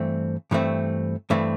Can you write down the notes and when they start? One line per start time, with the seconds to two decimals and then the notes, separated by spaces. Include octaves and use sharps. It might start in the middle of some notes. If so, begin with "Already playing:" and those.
Already playing: G2 E3 A3 C4
0.51 G2 E3 A3 C4
1.30 G2 E3 A3 C4